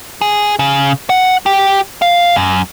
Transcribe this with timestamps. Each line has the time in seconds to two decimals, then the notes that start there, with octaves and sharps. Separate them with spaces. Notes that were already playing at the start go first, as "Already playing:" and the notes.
0.21 G#4
0.59 C#3
1.10 F#5
1.46 G4
2.02 F5
2.36 F#2